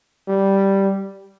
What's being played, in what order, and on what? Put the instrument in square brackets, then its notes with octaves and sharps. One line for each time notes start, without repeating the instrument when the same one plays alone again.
[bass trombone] G3